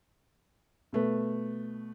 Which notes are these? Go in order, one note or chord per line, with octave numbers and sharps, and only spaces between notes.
B2 A3 B4